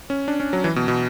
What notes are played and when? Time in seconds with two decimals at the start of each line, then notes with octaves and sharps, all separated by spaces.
0.10 C#4
0.28 D4
0.40 C#4
0.53 F#3
0.64 E3
0.76 B2
0.88 B2